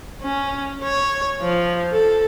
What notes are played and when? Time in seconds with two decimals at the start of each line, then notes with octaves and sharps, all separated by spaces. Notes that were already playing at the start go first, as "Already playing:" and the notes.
0.23 C#4
0.84 C#5
1.43 F3
1.92 A4